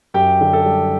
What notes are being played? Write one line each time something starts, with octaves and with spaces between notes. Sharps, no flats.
F#2 G4 G5
D3
A4
G3